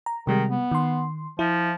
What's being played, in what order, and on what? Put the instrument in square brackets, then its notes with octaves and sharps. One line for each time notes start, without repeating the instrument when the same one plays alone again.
[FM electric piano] A#5
[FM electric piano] C3 G3 G#3 [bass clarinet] D#3
[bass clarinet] B3
[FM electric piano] D#3 C6
[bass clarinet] F3 [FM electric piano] E4